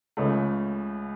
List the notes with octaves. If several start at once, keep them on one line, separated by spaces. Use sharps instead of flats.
C#2 C#3 A3